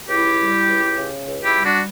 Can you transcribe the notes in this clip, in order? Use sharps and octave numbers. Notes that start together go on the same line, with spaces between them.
C#2 E4 G4
G3
C#2
C#3
C#2
E4 G4
G3
D4 F#4